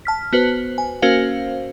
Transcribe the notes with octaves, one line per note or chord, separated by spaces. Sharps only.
A5 F6 B6
B3 F#4 B4 C5
G#5
A#3 C#4 F#4 A#4 C5 F5